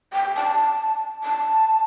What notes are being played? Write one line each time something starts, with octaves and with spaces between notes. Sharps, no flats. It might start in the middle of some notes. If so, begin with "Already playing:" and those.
G5
A5
A5